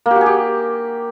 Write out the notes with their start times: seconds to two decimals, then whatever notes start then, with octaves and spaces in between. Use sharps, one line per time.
0.06 A#3
0.11 G4
0.16 F#4
0.21 G#4
0.26 G4